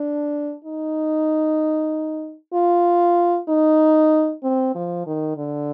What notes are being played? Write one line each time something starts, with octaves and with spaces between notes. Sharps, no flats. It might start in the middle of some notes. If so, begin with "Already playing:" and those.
Already playing: D4
D#4
F4
D#4
C4
F3
D#3
D3